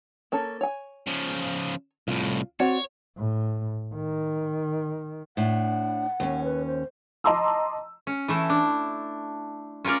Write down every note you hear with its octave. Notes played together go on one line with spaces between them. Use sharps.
A#3 C#4 A4
C#5 G#5
C#3 F3
C2 A2 F4
C4 F#4 C#5 D5
A2
D#3
A2 D4 F#5
D#2 C#4
B4
C5
D#5 A5 A#5 C6 D6 E6
C#4
E3 A3 E4
D4
C#4 F4 A#4 C#5 D5